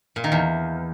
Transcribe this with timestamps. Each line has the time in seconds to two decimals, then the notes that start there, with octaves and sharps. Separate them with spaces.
0.16 A#2
0.24 D#3
0.32 E2